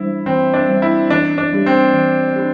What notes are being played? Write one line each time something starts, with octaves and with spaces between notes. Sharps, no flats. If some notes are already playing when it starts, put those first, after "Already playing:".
Already playing: E3 G3 D4 E4 C5
E3 C4
D4
G3 D4 C5
E4
E3 D4
D4
G3 D4 G4
C4
E3
D4 G4